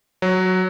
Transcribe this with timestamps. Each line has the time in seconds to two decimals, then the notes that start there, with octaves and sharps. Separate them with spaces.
0.22 F#3